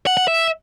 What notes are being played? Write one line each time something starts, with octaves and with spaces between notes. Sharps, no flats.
F#5
F#5
E5